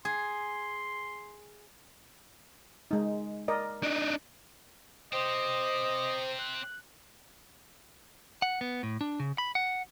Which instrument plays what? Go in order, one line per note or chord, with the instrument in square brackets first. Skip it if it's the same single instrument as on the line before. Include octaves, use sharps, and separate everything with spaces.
[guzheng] G#4 [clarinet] C6
[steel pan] G#3 D#4
A#4 D5 D#5
[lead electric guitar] D4 D#4
[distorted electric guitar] C4 G4 [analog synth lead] C5 [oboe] D#5
[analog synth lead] F#6
[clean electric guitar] F#5
B3
A2
D4
C#3
B5
F#5